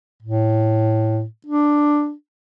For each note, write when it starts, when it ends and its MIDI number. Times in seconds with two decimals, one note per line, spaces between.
0.23 1.24 45
1.47 2.12 62